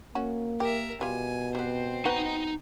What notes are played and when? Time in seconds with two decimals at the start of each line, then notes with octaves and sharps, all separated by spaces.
0.15 A#3 C#4 F#4
0.60 G4 A#4 E5
1.01 B2 G3 F4 G#5
1.55 G3 B3 C4 C5
2.05 B3 D#4 F#4 A#5